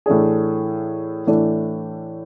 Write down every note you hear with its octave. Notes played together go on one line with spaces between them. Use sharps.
A2 E3 A3 D4 G#4
A2 E3 A3 D4